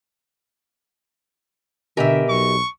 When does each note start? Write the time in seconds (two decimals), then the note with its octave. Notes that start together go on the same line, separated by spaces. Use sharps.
1.97 B2 D3 G4 A#4 E5 G#5
2.30 B1 C#6